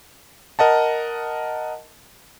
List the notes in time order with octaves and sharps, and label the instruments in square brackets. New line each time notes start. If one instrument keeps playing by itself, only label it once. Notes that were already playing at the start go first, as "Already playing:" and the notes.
[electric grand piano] A#4 D#5 F#5 A5